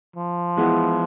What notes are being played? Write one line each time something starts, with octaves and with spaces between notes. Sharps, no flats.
F3
E3 G#3 B3 E4